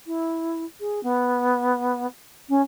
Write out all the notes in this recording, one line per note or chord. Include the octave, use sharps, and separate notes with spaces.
E4
G#4
B3
C#4